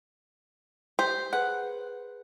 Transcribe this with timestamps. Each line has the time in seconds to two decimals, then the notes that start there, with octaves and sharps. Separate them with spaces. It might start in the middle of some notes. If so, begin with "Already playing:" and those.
0.99 G4 C5
1.33 G#4 B4 F#5